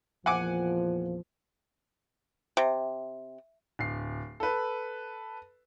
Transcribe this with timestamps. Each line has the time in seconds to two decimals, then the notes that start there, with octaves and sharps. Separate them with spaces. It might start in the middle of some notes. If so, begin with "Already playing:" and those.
0.26 E2 A#2 F3 F#5 G#5 D6
2.57 C3
3.79 D1 C7
4.40 A4 B4